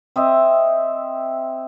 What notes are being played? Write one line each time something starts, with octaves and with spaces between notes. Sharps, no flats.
C4 D#5 E5